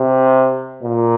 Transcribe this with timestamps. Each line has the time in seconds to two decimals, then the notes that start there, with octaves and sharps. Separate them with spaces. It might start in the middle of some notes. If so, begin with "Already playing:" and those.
Already playing: C3
0.83 A#2